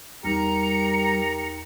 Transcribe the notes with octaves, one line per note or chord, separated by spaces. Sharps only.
E2 G3 D#4 G4 A#4 A#5 C#7